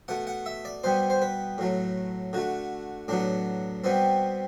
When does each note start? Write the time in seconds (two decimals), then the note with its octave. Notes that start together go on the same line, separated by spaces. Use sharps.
0.08 B2 A3 F#5
0.27 F#5
0.46 E5
0.65 D5
0.84 B2 G3 B3 C5
1.10 C5
1.22 B4
1.58 A2 F#3 A3
2.33 D3 A3 F#4
3.08 A2 F#3 B3 D4
3.84 B2 G3 B3 C4